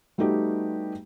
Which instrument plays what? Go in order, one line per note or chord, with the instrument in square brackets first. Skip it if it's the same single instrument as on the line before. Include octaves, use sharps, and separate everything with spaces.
[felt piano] G3 A3 B3 D#4 F#4 G4